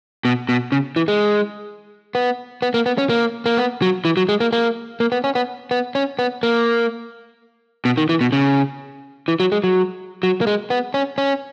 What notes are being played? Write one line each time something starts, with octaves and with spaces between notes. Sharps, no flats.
B2
B2
C#3
E3
G#3
B3
B3
A#3
B3
C#4
A#3
A#3
B3
F#3
E3
F#3
G#3
A#3
A#3
A#3
B3
C#4
B3
B3
C#4
B3
A#3
B2
D#3
E3
B2
C#3
E3
F#3
G#3
F#3
F#3
A#3
G#3
B3
C#4
C#4